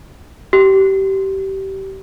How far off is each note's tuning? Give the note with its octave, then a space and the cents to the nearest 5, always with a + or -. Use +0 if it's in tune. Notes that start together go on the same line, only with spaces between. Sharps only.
G4 -25